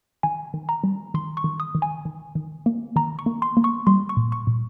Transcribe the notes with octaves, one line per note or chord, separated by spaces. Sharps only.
D#3 G#5
D#3
A#5
G3
D#3 C6
C#6
D#3
D#6
D#3
G#5
D#3
D#3
A#3
D#3 A#5
C#6
A#3
C6
A#3
C#6
G3 C6
C#6
A#2
C#6
A#2